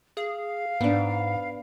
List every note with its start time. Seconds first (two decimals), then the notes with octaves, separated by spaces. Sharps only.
0.17 G#4 F5
0.81 G#2 B3 D4